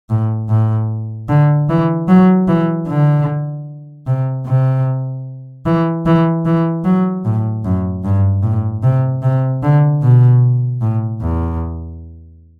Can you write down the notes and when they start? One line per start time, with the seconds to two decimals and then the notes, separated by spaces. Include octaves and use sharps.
0.10 A2
0.49 A2
1.29 D3
1.69 E3
2.08 F#3
2.48 E3
2.88 D3
4.07 C3
4.46 C3
5.66 E3
6.06 E3
6.46 E3
6.85 F#3
7.25 A2
7.65 F#2
8.04 G2
8.43 A2
8.83 C3
9.22 C3
9.63 D3
10.02 B2
10.81 A2
11.21 E2